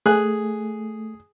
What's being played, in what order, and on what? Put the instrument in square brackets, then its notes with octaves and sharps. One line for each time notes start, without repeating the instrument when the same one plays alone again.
[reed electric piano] A3 [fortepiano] G#4 F#6